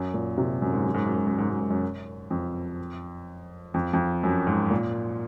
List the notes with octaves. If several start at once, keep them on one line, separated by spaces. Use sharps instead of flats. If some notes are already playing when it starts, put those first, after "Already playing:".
Already playing: F#2
A#2
C3
F#2
G#2
F#2
G#2
F#2
G#2
F#2
G#2
F#2
G#2
F#2
F2
F2
F2
F#2
G#2
A#2